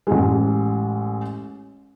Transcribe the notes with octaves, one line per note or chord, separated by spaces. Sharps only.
A1 G#3